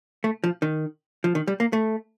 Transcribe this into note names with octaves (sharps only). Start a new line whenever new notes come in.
A3
F3
D#3
F3
D#3
G3
A#3
A3